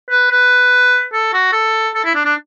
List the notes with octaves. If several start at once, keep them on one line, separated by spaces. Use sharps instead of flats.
B4
B4
A4
F#4
A4
A4
E4
D4
D4